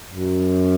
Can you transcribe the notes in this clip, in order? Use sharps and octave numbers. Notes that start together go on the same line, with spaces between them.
F#2